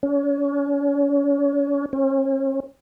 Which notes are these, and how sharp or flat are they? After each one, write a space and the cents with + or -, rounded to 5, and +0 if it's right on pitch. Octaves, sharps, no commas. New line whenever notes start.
C#4 +35
C#4 -40